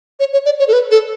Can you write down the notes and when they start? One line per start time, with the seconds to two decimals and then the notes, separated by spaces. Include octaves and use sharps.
0.20 C#5
0.33 C#5
0.45 D5
0.59 C#5
0.68 A4
0.73 B4
0.91 A4